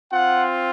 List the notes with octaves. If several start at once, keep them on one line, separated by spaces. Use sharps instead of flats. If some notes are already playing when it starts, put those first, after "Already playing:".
C4 F4 F#5